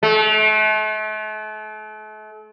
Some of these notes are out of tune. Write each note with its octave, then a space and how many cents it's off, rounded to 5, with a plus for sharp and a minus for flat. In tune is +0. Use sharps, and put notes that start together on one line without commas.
A3 -40